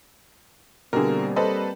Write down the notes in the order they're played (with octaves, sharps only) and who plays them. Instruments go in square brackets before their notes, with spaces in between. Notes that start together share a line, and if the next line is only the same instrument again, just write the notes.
[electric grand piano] B2 G4 G#4 [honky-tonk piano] D3 A#4 [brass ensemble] G3 A#3 C4
[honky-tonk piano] A4 B4 C5 [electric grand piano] D#5